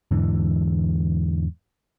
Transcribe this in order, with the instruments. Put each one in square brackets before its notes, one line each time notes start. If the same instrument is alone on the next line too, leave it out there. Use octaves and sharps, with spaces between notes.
[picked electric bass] E2 G#2 D3 E3